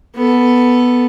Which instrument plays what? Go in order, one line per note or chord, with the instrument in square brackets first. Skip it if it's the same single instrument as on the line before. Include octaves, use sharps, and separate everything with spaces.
[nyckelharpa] B3 A4